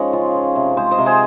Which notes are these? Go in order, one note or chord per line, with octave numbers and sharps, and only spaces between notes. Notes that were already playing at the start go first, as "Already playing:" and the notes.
Already playing: F3 G#3 C#4 D#4
C#3 F4 G#4
F3
C3
G#3 G#4 C5
C5 D#5
C3
G#4 C5